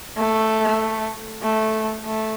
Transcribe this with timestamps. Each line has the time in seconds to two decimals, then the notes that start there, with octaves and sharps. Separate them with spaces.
0.17 A3
1.42 A3
2.05 A3